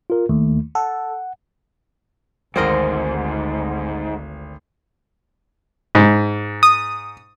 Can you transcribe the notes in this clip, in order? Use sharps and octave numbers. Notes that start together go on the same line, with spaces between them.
F4 A#4
D#2 A3
A4 F#5
G#1 D2 G#2 C4 A#4 D#5
G#2
D#6